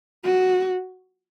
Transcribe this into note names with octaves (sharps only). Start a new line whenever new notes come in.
F#4